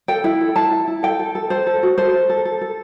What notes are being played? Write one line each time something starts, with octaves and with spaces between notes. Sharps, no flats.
A4 G5
E4
A4
E4 A5
E4
E4
A4 G5
A4
A4
A4 C5
A4
F#4
A4 C5
A4
A4
A4
A4